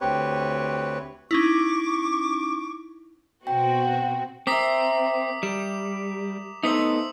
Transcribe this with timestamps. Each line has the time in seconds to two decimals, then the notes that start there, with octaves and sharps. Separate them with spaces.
0.01 D2 C4 G4 B4 C#5
1.31 C#4 D#4 E4 C#6 D6
3.47 B2 C4 F#4 G5
4.47 C4 A#4 E5 D6 D#6 B6
5.43 G3 E7
6.63 A3 B3 D#4 C5 D#6 E6 B6 F7